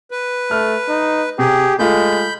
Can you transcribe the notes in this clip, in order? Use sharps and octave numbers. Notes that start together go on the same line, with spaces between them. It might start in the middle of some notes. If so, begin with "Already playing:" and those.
B4
A3 F6
D#4
C3 G4 G#4
G#3 A3 F4 B5 G6